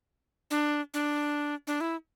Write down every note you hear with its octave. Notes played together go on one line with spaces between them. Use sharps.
D4
D4
D4
E4